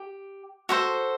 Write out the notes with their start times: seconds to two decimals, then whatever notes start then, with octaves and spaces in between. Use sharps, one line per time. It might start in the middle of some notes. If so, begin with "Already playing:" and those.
Already playing: G4
0.69 F#4 A4 C5